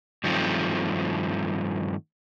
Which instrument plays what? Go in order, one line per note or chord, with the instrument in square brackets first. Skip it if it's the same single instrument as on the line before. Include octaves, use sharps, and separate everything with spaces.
[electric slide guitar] G2 D#3 F3 F#3 A3 C4